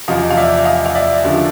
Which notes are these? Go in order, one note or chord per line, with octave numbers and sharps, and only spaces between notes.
E2 C3 F3 D#5 F5
F5
D5 E5
D#5 F5
F5
D5 E5
D#2 D3 F3